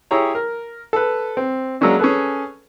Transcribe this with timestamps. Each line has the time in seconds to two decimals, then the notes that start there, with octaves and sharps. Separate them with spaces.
0.11 E4 G4 G#4 C#5 A#5
0.35 A#4
0.93 A4 B4
1.37 C4
1.81 F#3 G#3 A#3 C#4 D4
1.99 C#4 G#4 A4 B4